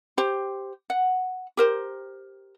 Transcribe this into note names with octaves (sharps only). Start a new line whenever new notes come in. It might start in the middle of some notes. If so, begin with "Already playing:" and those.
G4 C5
F#5
G4 A#4 C5